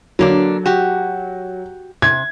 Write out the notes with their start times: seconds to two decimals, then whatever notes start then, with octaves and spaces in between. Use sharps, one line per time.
0.19 D3 F#3 A#3 D4
0.66 F#4 G4
2.02 C3 G#6